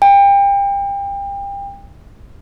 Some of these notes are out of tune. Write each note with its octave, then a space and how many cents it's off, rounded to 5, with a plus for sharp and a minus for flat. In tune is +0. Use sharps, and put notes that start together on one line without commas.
G5 +30